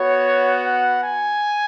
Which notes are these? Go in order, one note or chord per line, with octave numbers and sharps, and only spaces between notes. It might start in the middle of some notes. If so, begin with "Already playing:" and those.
Already playing: B3 F#4 C#5
F#5
G#5